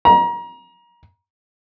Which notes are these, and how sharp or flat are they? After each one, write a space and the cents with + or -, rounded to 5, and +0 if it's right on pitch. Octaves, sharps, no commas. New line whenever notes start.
A#5 +30